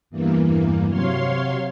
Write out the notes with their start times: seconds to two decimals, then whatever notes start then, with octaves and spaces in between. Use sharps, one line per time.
0.10 E2 G2 E3 A#3
0.87 C3 F#3 C#5 F5 C6